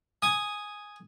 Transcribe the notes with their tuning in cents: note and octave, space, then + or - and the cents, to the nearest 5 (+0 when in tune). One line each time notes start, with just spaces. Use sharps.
G#5 +0 D#6 +0